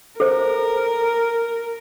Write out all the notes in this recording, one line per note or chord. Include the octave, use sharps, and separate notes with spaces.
A4 A#4 C5